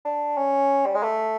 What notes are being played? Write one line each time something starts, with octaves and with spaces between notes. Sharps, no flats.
D4
C#4
G3
G#3
A3